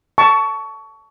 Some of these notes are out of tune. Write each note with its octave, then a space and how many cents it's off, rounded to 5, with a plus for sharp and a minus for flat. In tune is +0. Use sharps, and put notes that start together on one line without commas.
A5 +0 C#6 +20